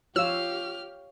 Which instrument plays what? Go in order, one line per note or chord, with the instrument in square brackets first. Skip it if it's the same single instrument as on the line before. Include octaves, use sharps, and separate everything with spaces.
[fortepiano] F3 F4 [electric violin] G4 F6 [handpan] C#5 F5 [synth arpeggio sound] E6